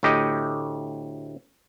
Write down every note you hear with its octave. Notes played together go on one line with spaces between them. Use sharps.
D2 A2 G4 D#5